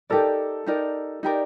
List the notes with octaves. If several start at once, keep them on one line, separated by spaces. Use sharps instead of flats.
D#4 G4 A4 A#4 D5
D#4 G4 A#4 D5
D#4 G4 A#4 D5